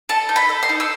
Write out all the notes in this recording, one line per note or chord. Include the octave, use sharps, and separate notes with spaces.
A4 A5
D#4
B5
A4
C6
D#4
E6